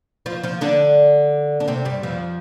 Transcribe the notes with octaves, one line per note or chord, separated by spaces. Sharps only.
F3 F4
F3 F4
D3 D4
D4
C3 C4
G2 G3
F2 F3